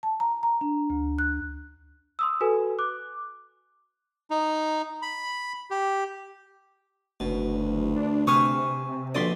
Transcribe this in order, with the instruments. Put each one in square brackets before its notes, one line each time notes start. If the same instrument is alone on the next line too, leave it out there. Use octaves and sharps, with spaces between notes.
[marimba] A5
A#5
A#5
D4
D2
F#6
[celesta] C6 D#6 E6
F#4 A4 B4 G#5
D6 F#6
[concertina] D#4
B5
G4
[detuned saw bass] F#1 [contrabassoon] D2 [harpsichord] B2
[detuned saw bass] D4
[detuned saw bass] C3 [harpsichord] B4 C5 G#5 [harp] C#6 D#6 F6
[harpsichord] A#1 B2 D#6 [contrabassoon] D3 [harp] D5 C6 B6